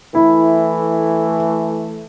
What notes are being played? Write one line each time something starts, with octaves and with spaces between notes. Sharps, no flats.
E3 A3 E4